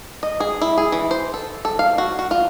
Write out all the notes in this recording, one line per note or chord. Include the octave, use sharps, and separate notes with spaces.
D#5
G#4
E4
G#4
E3
C5
A4
A4
F5
F#4
F#4
F4